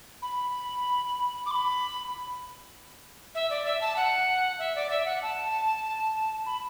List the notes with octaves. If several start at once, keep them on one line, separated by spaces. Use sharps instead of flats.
B5
D6
B5
E5
D5
E5
A5
F#5
E5
D5
E5
F#5
A5
B5